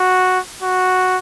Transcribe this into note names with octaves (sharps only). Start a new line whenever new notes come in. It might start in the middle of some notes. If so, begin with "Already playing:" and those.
Already playing: F#4
F#4